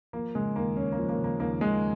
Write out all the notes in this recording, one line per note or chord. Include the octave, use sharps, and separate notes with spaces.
F3 A#3
C#3 G#3
D#2 A#3
D#2 C#4
A#3
F3
A#3
C#3
A#3
D#2 A#3
D#2 G#3